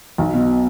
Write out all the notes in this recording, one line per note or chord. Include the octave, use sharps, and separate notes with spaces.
B1
B2